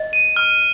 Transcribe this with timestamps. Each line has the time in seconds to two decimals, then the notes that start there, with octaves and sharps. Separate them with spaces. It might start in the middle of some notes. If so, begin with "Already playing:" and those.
Already playing: D#5
0.13 D#7
0.36 F6